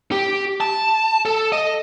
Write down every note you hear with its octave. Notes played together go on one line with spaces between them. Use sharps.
G4
A5
A4
D#5